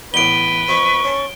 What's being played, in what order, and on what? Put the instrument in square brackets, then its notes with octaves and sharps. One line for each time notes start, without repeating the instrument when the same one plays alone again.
[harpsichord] E2 A2 [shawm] B4 [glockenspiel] D7 G7
[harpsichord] F2 [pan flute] C#6
[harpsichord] C#4 A5